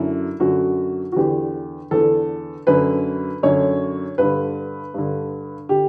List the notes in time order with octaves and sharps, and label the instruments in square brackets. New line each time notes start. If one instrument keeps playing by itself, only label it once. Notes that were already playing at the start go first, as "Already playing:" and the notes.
Already playing: [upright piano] F#2 D3 E4
F#2 D3 F#4
F#4
E2 D3 G4
E2 D3 A4
F#2 D3 B4
F#2 D3 C#5
G2 D3 B4
G2 D3
D3 G4